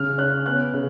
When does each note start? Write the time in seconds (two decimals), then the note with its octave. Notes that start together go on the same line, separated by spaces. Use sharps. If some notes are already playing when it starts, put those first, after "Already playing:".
Already playing: C#3 F6
0.18 C#4 F#6
0.46 B3 F#6
0.73 C#3